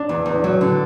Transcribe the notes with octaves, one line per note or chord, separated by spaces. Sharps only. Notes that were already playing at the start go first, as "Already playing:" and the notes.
Already playing: D4
E2
E2
F#3
D3